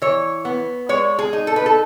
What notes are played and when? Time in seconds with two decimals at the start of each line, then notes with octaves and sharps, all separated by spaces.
0.02 E3 C#5
0.45 B3
0.89 G#3 C#5
1.19 G#4
1.33 D#4
1.47 A4
1.56 B4
1.66 A4